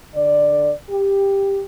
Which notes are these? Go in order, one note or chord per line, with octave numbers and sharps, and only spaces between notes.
D3 D5
G4